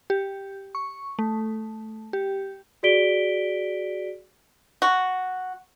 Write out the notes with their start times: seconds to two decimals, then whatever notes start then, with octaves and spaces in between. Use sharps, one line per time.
0.10 G4
0.75 C#6
1.19 A3
2.13 G4
2.83 F#4 G#4 D5 B6 D7 G7
4.82 F#4